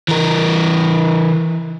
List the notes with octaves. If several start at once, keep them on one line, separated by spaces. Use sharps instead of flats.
E3 A#4